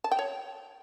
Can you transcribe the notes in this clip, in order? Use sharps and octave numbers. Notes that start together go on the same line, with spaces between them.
A5
G5
C#5